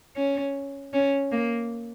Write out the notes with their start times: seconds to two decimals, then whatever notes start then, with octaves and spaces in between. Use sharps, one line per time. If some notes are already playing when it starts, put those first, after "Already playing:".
0.16 C#4
0.93 C#4
1.32 A#3